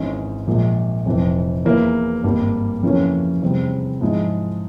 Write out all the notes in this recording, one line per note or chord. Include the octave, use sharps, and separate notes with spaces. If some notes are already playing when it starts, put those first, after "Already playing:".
Already playing: G#1 G#2 E3 G#3 C#4
A#1 A#2 G#3
F1 F2 E3
E2 E3 A#3 E4
G#1 G2 G3 A#3
F2 C#3 E3 A#3 C#4
E2 C3 G3 C4
G#2 F3 G#3 E4